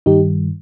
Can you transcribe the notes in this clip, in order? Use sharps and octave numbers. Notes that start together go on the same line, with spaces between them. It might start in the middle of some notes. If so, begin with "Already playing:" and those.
G2 D#3 G3 D#4 G4